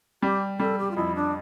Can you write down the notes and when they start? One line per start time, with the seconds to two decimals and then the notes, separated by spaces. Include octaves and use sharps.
0.22 G3 G4
0.59 G3 A4
0.78 G4
0.91 F4
0.96 F2 E4
1.15 D4